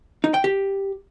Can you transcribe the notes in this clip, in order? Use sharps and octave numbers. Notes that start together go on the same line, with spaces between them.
D#4
G5
G4